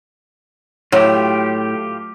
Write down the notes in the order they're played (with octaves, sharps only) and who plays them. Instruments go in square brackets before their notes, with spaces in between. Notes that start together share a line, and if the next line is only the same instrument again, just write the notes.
[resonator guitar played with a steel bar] A2 [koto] F#3 [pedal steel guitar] F4 G4